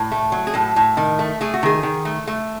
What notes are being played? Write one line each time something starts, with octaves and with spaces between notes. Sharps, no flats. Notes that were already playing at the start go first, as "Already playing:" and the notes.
Already playing: A2
A3
F#3
G#4
A2 A4
A2
D#3
A3
A3 G#4
F#4
D#3 G#4
D#3
A3
A3